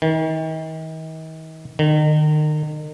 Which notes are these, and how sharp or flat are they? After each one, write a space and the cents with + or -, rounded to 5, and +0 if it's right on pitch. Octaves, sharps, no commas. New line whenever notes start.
D#3 +40
D#3 -35